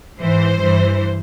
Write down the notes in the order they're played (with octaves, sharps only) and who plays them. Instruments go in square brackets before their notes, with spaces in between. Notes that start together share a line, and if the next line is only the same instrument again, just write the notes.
[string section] G#2 E3 C5
G2 E3